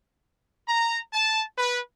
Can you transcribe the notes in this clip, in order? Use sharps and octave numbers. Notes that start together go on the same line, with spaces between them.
A#5
A5
B4